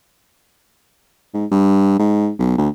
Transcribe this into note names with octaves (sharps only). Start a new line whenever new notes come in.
G#2
G2
G#2
B1
D2